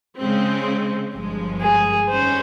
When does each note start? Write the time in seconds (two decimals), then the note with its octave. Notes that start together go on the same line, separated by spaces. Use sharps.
0.18 C#3 G#3 C4
1.14 G1 G2 F3 G#3
1.62 G#4
2.09 F2 D#3 G3 C#4 C5